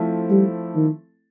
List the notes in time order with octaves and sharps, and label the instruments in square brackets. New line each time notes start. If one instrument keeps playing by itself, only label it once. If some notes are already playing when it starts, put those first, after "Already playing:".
Already playing: [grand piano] F3 A3 C4 E4 A4
[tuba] G3
D#3